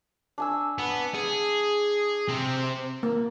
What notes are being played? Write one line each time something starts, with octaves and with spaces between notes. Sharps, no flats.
D4 G#5 E6
B3
G#4
C3 C4
A#3